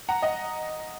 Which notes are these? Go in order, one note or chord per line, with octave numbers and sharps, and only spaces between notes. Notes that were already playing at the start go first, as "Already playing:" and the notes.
F#5 A#5
D#5 F#5